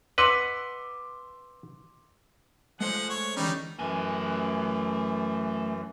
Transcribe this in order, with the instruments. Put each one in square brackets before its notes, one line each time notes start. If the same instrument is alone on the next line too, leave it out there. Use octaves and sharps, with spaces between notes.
[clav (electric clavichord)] B4 D#5 F#5 [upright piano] C6 D6 E6
[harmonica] F3 F#5 [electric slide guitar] G#3 A3 C5
[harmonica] C#5
[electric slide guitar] D3 E3 C#4 [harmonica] G3 D#4
[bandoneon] F#2 E3 [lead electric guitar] A3 G#5